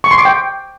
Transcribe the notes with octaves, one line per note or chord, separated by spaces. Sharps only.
C#6
C6
D6
G5